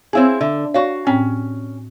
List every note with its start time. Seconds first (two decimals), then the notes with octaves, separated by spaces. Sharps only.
0.13 C4 E4 G#4 C#5 F5 G#5
0.41 D3 E5
0.74 F#4 C#5 D5 F5 C#6
1.07 A2 C4 C#4 G5